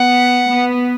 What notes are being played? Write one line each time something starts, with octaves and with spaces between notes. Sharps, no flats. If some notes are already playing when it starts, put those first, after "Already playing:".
Already playing: B3 F#5
B3